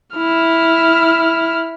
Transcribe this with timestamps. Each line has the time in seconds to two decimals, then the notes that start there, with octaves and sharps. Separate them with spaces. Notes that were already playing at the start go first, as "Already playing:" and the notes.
0.17 E4 F6